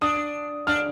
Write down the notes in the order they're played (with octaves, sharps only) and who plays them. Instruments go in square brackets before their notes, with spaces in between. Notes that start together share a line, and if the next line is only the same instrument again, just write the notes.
[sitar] D4 [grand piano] D#6
[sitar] D4 [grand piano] F6